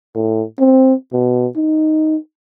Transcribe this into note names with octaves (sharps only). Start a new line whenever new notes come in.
A2
C4
B2
D#4